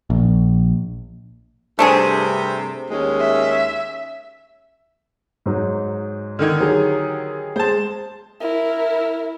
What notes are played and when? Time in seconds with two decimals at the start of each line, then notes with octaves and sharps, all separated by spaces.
0.10 A#1
1.79 G2 C3 A3 D4 G#4 C5
2.90 D#2 G#3 C#4
3.21 E5
5.46 G#2 F#3 D#4
6.39 D3 D#3 D#4 F6 G#6
6.60 F#3 G4 G#4
7.56 G#3 C5 A5
8.41 E4 A#4